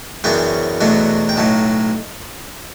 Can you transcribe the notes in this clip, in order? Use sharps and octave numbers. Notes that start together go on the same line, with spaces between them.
F#2 C#3 E3 B3 D4 G5
E2 B2 F#3 A3 D4
G5
B1 A2 F#3 A5